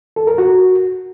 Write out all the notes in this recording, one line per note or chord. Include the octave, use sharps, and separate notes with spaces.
A4
A#4
F#4